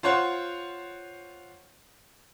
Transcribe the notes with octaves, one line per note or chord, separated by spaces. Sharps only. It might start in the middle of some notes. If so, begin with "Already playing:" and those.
F4 C5 C#5 F#5